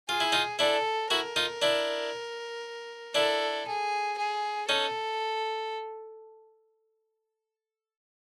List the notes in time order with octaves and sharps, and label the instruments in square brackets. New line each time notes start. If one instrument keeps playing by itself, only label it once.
[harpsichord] F4 [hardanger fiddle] G#4
[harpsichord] E4
D#4 F4
[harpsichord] D4 E4 [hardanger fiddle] A4
[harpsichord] E4 F#4 [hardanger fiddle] A#4
[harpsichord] D#4 F4
D4 E4
[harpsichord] D4 E4 [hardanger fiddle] A4
[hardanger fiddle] G#4
G#4
[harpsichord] C#4 D#4 [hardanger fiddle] A4